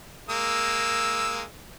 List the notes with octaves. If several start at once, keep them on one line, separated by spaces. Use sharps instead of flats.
G#3 A#3 E6